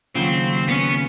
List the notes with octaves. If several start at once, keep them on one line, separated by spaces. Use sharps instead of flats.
D#2 C#3 F#3 C4 F4
B3 C#4